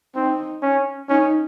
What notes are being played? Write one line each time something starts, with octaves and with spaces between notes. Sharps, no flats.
C4 D#4
C#4
C#4 D#4